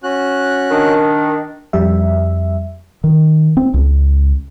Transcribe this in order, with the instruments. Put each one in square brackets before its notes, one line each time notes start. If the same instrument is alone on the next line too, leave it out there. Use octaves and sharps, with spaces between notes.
[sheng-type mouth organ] C#4 F#4 F#6
[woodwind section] D#3 D4
[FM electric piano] F2 G3 E5
[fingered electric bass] D#3
C4
C#2